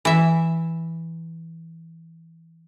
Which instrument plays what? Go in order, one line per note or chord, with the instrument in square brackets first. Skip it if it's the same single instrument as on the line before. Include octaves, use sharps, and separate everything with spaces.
[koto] E3 E5